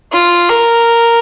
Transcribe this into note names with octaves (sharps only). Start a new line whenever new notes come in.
F4
A#4